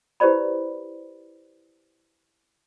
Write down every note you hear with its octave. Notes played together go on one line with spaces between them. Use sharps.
E4 G4 B4 C5 D5 B5